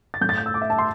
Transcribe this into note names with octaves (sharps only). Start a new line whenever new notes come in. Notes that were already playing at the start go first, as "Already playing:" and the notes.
A6
A2 A3 G6
A6
G6
E6
D6
E5
A5
C6